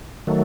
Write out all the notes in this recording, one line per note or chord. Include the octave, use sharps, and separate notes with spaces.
D#3 F#3 A3